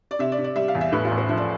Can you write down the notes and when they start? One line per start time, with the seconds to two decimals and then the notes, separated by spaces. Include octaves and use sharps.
0.11 D5
0.19 C3 E5
0.32 D5
0.38 C3
0.44 D5
0.56 G3 E5
0.68 F5
0.75 E2
0.81 E5
0.92 A2 B4
1.05 F4
1.11 A1
1.18 C5
1.29 F3 E5
1.37 D5